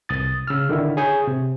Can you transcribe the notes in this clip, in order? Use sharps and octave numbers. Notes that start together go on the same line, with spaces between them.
C2 D#6 A6
C#3 E6 F6
D3 D#3 E4
G#4 C#5 G#5 D#6 G6
C3